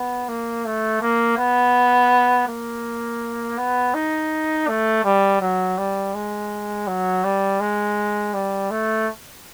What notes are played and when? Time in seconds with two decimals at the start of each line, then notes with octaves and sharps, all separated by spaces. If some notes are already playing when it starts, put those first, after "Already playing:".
Already playing: B3
0.29 A#3
0.65 A3
1.01 A#3
1.38 B3
2.48 A#3
3.58 B3
3.94 D#4
4.68 A3
5.04 G3
5.41 F#3
5.78 G3
6.14 G#3
6.87 F#3
7.24 G3
7.60 G#3
8.34 G3
8.70 A3